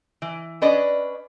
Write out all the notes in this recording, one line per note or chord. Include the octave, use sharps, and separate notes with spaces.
E3
C#4 D4 B4 D5 D#5